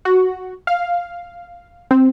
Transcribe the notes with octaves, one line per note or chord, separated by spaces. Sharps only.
F#4
F5
C4